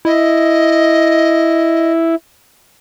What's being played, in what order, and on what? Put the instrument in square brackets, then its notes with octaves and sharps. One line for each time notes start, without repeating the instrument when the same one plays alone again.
[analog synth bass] E4 [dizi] D#5